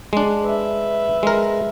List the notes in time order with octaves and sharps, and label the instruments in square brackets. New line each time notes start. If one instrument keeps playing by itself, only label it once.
[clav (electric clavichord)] G#3 D4
[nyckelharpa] B4 E5
[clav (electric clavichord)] G#3 A#4